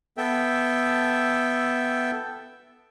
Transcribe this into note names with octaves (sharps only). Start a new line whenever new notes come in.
B3 A4 E5 G5